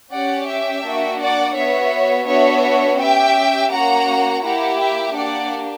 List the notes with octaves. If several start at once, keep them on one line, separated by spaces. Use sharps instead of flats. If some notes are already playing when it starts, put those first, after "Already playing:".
C#4 G4 D5 F#5
E5 G5
A#3 D4 F#4
D5 F#5
B3 F#4 C#5 E5
B3 D4 F#4 C#5 E5
C#4 G4 E5 G5
A#3 C#4 F#4 F#5 A#5
A#3 E4 G4 F#5 A#5
E5 G5
A#3 D4 G4 D5 F#5